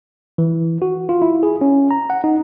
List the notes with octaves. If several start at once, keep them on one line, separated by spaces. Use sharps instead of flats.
E3
F#4
F4
E4
G#4
C#4
A#5
F#5
D#4